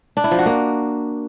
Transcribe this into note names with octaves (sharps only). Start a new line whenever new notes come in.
D4
E4
F3
F#4
A#3